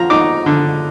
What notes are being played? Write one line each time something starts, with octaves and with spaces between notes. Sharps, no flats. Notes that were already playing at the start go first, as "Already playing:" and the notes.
Already playing: F3 A#5
D#4 D6
D3